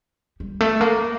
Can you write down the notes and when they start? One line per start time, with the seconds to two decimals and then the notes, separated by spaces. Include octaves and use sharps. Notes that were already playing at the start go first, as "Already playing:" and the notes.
0.40 G3
0.61 A3
0.81 A#3